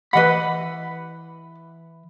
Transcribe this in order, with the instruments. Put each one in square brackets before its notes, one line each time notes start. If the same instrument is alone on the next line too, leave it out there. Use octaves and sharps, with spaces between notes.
[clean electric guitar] E3 B5 [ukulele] B4 D#5 F#5